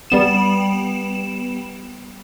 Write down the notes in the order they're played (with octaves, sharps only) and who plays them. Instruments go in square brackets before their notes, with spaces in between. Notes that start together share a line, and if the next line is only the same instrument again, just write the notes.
[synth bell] G3 B3 E7